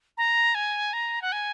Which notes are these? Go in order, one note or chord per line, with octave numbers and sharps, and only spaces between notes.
A#5
G#5
A#5
F#5
G#5